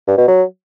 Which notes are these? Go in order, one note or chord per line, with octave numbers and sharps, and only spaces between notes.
G2
B2
F#3